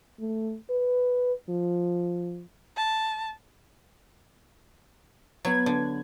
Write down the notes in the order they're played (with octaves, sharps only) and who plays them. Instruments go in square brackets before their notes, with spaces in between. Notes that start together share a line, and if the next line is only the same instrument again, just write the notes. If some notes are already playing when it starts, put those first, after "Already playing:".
[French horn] A3
B4
F3
[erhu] A5
[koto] F#3 [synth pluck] B3 B4 G#6
[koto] D3